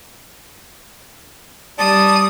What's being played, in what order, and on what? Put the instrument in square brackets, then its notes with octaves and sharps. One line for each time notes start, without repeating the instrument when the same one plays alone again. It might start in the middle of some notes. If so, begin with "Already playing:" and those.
[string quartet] G3 D#6 [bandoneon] D5 A5